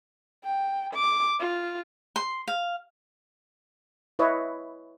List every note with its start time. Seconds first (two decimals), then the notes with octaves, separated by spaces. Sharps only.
0.44 G5
0.94 D6
1.40 F4
2.16 C6
2.48 F5
4.19 E4 B4 C#5 D#5 E5